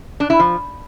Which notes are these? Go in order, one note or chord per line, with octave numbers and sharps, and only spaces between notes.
D4
E4
F3